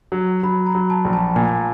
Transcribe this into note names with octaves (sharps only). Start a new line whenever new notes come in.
F#3
F#3 B5
A#5
F#3
A5
A#1
A5
A#2 G#5